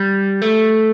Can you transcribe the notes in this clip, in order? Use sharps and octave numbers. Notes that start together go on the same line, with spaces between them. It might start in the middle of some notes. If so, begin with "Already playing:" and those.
Already playing: G3
A3